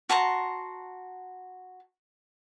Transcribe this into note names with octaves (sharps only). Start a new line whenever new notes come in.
F#4 A5 A#5 C6